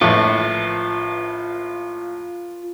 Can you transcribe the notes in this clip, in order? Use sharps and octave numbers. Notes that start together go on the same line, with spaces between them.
A#1 A2 F4 B4